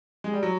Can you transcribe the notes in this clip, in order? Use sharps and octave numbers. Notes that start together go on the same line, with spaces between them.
G#3
G3
F#3